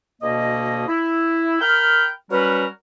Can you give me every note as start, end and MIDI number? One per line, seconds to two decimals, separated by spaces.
0.22 0.88 38
0.22 0.88 47
0.22 0.88 58
0.22 0.88 75
0.88 1.60 64
1.61 2.09 70
1.61 2.09 79
1.61 2.09 83
1.61 2.09 89
2.31 2.66 54
2.31 2.66 55
2.31 2.66 61
2.31 2.66 66
2.31 2.66 70
2.31 2.66 71